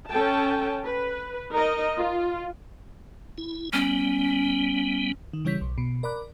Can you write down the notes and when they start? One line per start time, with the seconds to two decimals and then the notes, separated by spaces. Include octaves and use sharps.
0.10 C#4 A4 G5 A5
0.86 B4
1.52 D#4 A#4 D#5
1.98 F4
3.38 E4
3.73 G3 B3 C#4
5.33 D#3
5.45 C#3 E3 G3 C#5 G6 B6
5.61 B1
5.78 B2
6.03 A#4 D5 B5 D6 F#6